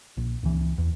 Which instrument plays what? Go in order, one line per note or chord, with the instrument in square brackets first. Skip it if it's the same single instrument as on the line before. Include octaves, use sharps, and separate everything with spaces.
[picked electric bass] A#1
C#2 E3
E2